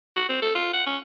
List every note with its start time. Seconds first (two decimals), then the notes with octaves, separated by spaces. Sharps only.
0.16 F#4
0.29 C4
0.42 A4
0.55 F4
0.73 F#5
0.86 C#4